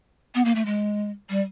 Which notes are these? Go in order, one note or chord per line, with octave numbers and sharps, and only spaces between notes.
B3
A#3
A3
G#3
G3